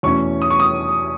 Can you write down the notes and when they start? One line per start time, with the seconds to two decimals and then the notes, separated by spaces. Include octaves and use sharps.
0.03 E2 B2 A3 C#4 C#6
0.42 D#6
0.51 C#6
0.60 D#6